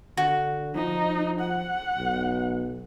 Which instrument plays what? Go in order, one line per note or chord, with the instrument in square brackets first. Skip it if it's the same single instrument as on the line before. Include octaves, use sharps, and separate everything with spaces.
[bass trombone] D3 [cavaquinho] F#4
[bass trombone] F3 [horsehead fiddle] D#4
[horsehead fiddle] F#5
[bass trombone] B1